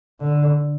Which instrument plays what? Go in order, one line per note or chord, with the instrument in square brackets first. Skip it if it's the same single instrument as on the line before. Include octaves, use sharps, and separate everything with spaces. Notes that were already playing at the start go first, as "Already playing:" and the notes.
[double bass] D3